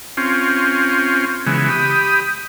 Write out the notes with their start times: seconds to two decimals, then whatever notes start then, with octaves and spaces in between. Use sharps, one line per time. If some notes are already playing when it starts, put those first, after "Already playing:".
0.17 C4 C#4 F4
1.46 C#3 E3 G#3 B3
1.69 G4 B5 D#6